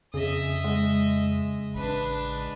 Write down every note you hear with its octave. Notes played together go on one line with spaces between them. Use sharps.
F2 C#3 G#4 D#5 E5
G#3
A1 D4 B4